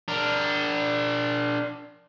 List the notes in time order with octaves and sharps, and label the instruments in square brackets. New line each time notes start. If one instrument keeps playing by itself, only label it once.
[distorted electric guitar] D4 A#4